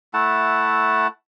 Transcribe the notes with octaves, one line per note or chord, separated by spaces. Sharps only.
A3 E4 F#5 A5